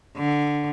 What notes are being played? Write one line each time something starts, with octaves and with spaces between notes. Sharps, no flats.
D3